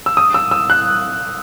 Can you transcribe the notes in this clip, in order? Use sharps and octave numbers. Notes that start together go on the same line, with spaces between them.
E6
D#6
E6
E6
F#6